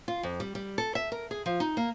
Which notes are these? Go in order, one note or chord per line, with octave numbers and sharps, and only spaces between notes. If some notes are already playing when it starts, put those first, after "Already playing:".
F4
F2
G3
G3
A4
E5
A#4
G#4
F3
D#4
A#3